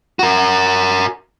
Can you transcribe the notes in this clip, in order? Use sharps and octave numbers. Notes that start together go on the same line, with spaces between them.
F#4 A#4